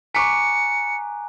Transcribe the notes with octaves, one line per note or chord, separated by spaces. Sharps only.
G#5 A#5 C#6 D6 F#6 B6 C#7